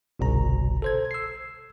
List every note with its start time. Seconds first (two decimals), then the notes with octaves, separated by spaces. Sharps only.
0.19 G1 C2 B2 A#5
0.82 A4 C5 G#6
1.11 E6 C7